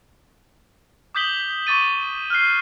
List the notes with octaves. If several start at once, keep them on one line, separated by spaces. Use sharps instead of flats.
D6 D#6 G6 B6 F#7 G7
C#6 D6 A6 D#7
F6 F#6 C7